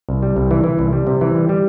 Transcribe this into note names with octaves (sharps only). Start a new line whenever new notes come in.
C2
G3
C2
E3
E3
C2
G3
C3
E3
G3
G3